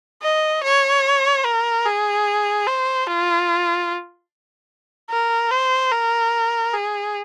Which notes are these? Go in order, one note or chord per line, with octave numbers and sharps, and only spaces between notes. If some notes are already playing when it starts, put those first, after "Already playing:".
D#5
C#5
A#4
G#4
C5
F4
A#4
C5
A#4
G#4